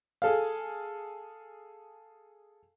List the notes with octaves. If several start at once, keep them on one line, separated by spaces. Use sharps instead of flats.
G#4 A4 F5